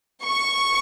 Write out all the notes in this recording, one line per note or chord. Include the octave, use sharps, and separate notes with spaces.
C#6